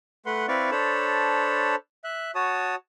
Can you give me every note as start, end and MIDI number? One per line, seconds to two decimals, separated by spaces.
0.26 0.46 57
0.26 0.46 71
0.26 0.46 78
0.26 0.46 84
0.48 0.70 60
0.48 0.70 64
0.48 0.70 71
0.48 0.70 74
0.48 0.70 77
0.48 0.70 85
0.71 1.75 62
0.71 1.75 69
0.71 1.75 72
0.71 1.75 73
0.71 1.75 81
0.71 1.75 83
2.04 2.31 76
2.04 2.31 90
2.35 2.75 66
2.35 2.75 73
2.35 2.75 81
2.35 2.75 87